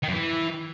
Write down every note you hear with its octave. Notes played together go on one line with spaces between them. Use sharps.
D#3
F#2
E3